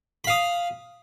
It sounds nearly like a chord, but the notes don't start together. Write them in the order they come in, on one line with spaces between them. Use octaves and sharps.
B5 F5 D#6